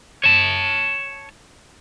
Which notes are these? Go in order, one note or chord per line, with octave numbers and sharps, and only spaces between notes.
C#5 A5